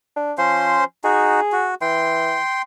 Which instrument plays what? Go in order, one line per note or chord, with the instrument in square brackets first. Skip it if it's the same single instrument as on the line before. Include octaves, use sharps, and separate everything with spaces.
[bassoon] D4
[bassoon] F3 [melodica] C#4 C5 C6
[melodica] D#4 F#4 [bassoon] G#4
[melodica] F#4
[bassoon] E3 [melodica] G5 C6